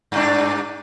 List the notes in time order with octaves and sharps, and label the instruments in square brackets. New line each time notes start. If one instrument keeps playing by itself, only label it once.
[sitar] G2 D4